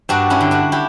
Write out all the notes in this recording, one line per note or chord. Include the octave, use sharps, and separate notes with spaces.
G2 D4 F#4
C#4 E4
D3
D4 F#4
E4 G4